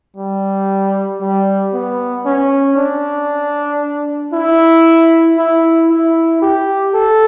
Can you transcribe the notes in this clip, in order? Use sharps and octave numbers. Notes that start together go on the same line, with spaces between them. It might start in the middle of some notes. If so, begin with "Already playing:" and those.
G3
G3
B3
C#4
D4
E4
E4
E4
G4
A4